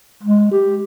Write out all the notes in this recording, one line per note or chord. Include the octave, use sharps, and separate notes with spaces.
G#3
G4